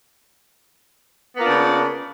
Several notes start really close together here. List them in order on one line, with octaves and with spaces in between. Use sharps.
B3 A#3 F4 D4 C#3